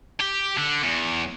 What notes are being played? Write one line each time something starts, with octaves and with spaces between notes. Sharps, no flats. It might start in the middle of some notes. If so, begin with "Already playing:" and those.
G4
D3
E2